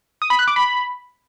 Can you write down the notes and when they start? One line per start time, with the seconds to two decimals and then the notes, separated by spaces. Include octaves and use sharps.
0.22 D#6
0.30 B5
0.39 F#6
0.48 D6
0.56 B5